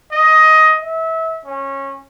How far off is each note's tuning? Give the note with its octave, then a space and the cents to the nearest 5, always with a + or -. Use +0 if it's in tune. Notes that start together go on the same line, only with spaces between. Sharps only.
D#5 +10
E5 -25
C#4 -20